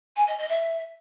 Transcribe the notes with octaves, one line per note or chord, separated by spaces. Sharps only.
G#5
D#5
D#5
E5